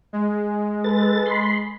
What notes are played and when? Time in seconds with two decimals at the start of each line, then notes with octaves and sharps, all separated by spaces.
0.13 G#3
0.84 A4 B4 A6
1.26 B5 C6